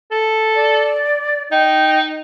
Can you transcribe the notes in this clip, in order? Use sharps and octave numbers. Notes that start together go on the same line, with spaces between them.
A4
D5
D#4 G5